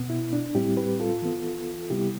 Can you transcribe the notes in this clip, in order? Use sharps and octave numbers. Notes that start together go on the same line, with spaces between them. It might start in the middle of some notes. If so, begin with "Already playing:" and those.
Already playing: B2 B3
E4
D4
A2 G3 C4 E4 G4
G4 B4
F4 A4
E3 B3
C3 G3 B3 E4 G4